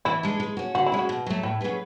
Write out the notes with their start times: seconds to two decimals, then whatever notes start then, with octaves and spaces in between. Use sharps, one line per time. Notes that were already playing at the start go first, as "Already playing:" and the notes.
0.05 E3 E4
0.23 G#3 D4
0.40 G#3
0.57 C#4 F#4
0.75 D3 F#4
0.86 E4
0.92 G#3 C#4
0.99 F#4
1.09 B2
1.26 F#3 A3
1.43 A2 E4
1.61 F#3 C#4 G#4 B4